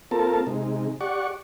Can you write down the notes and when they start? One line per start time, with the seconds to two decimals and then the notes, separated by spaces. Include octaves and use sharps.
0.11 A#3 C4 F4 A4 A#4 A5
0.47 C3 G#3 D#4
1.01 G4 D5 F#5 C#6